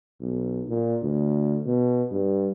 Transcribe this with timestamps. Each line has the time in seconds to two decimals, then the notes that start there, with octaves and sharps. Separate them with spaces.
0.21 B1
0.68 A#2
1.03 D2
1.66 B2
2.11 G2